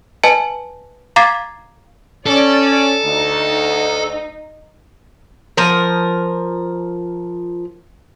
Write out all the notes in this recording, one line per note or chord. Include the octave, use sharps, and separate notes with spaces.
B4 D#5 G#5 A5
F5 A#5 D6 G#6 A6 C7
C#4 A4 D5
D2 D#4
F3 A#4